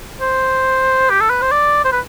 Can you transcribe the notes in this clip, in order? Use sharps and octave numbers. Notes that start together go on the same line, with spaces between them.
C5
G4
A4
B4
C5
D5
C5
B4